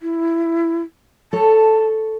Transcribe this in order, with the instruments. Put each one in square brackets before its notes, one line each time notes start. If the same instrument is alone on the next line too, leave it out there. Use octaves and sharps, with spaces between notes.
[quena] E4
[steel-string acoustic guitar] A4 C#5 [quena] A5